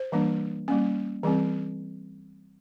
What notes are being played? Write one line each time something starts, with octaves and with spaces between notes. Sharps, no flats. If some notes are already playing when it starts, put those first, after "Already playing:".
Already playing: C5
E3 G3 A#3 D4
G3 A#3 C#4
E3 G3 C4 G#4